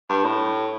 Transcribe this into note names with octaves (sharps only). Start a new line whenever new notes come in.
G2
A2